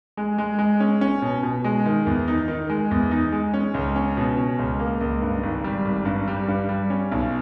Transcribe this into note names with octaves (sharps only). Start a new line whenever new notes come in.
G#3
G#3
G#3
C#4
C#4
B2
B2
G#3
D#3
E2
D#4
D#3
G#3
E2
D#4
G#3
C#4
C#2
C#4
B2
C#4
C#2
A#3
C#2
G2
G#1
G3
G#1
G2
G3
G2
G3
C#4
B1